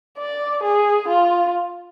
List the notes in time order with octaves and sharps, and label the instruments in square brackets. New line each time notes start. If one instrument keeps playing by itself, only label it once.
[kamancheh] D5
G#4
F4